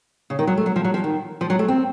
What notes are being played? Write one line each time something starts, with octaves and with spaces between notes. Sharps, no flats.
C#3
D#3
F#3
A3
F#3
F3
F#3
F3
D#3
F3
F#3
A3
C4